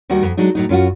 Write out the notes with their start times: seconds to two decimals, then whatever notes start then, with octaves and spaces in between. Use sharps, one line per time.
0.10 D#2 D#3 G3 F#4
0.23 F2
0.37 F#3 G#3 D4 D#4
0.55 A2 F#3 D#4
0.69 F#2 C#4 F4 F#4